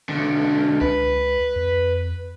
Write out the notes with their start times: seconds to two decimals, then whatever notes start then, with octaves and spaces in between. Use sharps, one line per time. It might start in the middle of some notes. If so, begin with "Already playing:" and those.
0.09 B1 D3
0.81 C#2 B4
1.56 F2